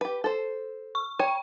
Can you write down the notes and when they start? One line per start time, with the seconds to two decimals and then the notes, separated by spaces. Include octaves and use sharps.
0.01 G4 B4
0.24 A4 C5
0.95 C#6
1.19 C#5 G5